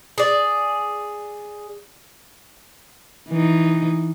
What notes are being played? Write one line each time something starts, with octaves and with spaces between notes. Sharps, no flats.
G#4 D5
E3 D#4